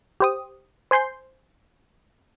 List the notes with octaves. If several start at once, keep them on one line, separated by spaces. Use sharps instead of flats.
G4 C5 D#6
C5 G#5 C6 G6 C7